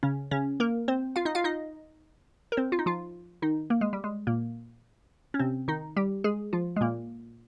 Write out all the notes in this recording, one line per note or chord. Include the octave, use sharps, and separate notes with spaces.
C#3 C#4
C#3 C#4
A#3 A#4
C4 C5
F4 F5
D#4 D#5
F4 F5
D#4 D#5
A#4
C4 C5
F4
D#4
F3 F4
D#3 D#4
A#3
G#3
G3
G#3
A#2 A#3
C#4
C3 C4
D#3 D#4
G3 G4
G#3 G#4
F3 F4
G#3
A#2 A#3